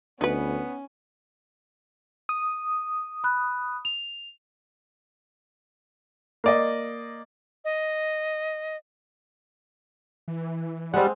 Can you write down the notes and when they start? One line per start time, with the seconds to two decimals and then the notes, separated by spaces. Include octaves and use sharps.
0.21 D2 B3 C#4 D#4 B4
2.29 D#6
3.24 B5 F#6
3.85 F7
6.44 A#3 D5 D#5
7.65 D#5
10.28 E3
10.94 G3 G#3 C4 F#5